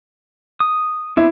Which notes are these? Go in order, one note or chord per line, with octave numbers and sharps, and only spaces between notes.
D#6
B3 C4 D4 E4